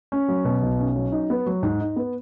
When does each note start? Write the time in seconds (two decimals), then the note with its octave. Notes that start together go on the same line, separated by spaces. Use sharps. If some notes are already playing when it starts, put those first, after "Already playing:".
0.12 C#4
0.28 F#3
0.45 B2
0.63 B1
0.79 C#4
0.96 F#3
1.12 D#4
1.30 B3
1.46 F#3
1.63 G#2
1.80 D#4
1.96 B3